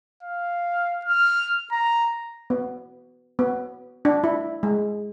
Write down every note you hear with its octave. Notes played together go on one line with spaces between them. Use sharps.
F5
F6
A#5
B3
B3
D4
E4
G#3